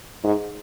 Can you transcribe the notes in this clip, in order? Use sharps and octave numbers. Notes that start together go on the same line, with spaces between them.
G#2